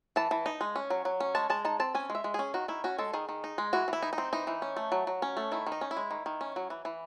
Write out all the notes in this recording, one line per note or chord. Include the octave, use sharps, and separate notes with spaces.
E3 A5
E3
D#4
G#3
C#4
F#3
F#3
C#4
G#3 A5
G#3 A5
D#4 A5
C4 A5
C#4 G#5
G#3
E5
G#3
C#4 G#4
D#3 F#4
D#3 E4
C#4 F#4
G#3 A4
D#3 G#4
D#3
D#4
G#3
E3 F#4
E3 E4
D#4
D#4
C4
E3 D#4
E3
C#4
A3
F#3
F#3
C#4
A3
D#3 E4
D#3
D#4
C#4
E4
G#3
D#3
D#3
C#4
F#3
E3
E3